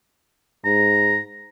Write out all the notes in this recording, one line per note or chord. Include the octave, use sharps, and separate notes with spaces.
G#2 A#5